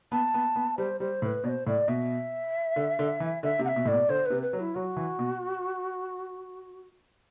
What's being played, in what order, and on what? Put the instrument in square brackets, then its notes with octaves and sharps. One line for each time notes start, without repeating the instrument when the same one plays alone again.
[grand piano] B3 [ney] A5
[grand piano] B3
B3
[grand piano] G3 [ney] C5
[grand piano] G3 [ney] C5
[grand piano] A2 [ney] C5
[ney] B4
[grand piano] B2 [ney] D5
[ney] C5
[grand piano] A2 [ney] D5
[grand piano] B2 [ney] E5
[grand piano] D3
D3
E3
[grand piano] D3 [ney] E5
[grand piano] C3
[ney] F#5
E5
[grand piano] B2
[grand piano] A2 [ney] D5
[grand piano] B2
[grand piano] D3 [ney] C5
[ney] B4
[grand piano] C3
[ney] B4
[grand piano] F#3
[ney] E4
[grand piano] F#3 [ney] F#4
[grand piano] E3
B2